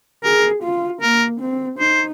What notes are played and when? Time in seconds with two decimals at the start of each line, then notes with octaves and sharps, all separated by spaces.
0.24 G#4 A#4
0.63 F4
1.01 A#3 A#4
1.40 C4
1.79 D#4 C5